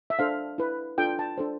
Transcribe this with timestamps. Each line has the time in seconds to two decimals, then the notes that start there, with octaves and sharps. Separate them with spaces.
0.10 E5
0.19 D4 A4 C5 F5
0.58 E4 B4
0.98 D4 F4 A4 G5
1.19 A5
1.38 D4 A4 C5